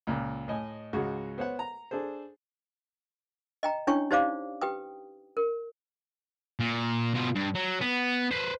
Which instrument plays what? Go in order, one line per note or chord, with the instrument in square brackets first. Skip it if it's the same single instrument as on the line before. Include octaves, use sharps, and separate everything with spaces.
[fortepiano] C#2 A#2
A2 D#5 G#5
C#2 G#2 G#3 F#4
B3 C5 C#5 F#5
A#5
D4 G#4 A4 C5
[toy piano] D#5 G5 A#5
C#4 D4 E4 C#5 G5 C#6
D#4 G4 C5 D5 F5 D6
G4 B4 G5 D#6
A#4
[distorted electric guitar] A#2
B2 F4
G2
F#3
B3
B4 C5